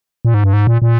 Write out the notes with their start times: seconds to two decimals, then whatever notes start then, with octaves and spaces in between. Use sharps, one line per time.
0.25 A#2
0.34 G#2
0.44 G2
0.53 G#2
0.67 A#2
0.82 A#2